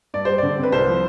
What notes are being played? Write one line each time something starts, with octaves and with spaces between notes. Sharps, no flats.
G2 D5
G3 C5
D3 D5
C4
B4
C2 C5
F3